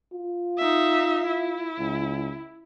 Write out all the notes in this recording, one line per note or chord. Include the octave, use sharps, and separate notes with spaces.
F4
D#4 E5
E4
C#2